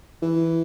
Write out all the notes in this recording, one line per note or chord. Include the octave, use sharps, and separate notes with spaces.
E3